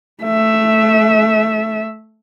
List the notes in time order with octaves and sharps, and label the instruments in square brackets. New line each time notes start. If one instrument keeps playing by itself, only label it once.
[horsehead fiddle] A3 E5